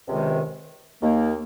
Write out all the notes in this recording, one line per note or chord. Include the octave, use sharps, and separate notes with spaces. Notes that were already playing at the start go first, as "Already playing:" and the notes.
C#2 C3 D#3 G#3
D#2 D#3 A#3